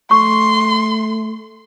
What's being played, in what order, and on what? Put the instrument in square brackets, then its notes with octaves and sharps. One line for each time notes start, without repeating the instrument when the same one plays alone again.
[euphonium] A3 [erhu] C6 [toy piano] C#6